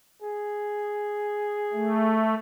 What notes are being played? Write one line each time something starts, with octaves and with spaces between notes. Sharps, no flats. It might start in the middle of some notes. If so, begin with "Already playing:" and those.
G#4
A3